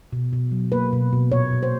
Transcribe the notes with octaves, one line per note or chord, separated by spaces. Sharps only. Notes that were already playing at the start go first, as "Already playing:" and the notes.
B2
B2
F#3
A#3 B4
B2
B2
A#2 C#5
A#2
C5